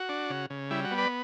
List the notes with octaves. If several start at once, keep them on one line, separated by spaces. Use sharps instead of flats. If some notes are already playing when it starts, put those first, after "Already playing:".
Already playing: F#4
D4
C#3
C#3
G3 E4
F#4
B3
B4 D5